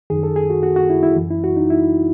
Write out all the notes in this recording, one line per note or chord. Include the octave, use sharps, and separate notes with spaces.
F#2 D#3 G#4
A4
G#4
F#4
F#4
F#4
E4
E4
F#2 E3
E4
F#4
D#4
E4